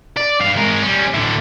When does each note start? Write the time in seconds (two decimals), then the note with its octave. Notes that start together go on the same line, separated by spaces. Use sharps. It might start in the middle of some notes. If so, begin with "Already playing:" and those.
0.17 D5
0.40 G2 F5
0.57 G#3 A#4
0.83 G3 C#4
1.14 A2 D3